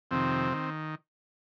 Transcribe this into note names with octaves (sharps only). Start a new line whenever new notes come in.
F2 C3 D#3 C4
D#3